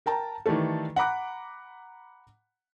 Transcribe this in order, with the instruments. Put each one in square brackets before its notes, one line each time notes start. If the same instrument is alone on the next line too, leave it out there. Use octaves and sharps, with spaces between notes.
[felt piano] A#4 G5 A5 A#5
D#3 E3 G3 A3 A4
F#5 A#5 B5 D6 F#6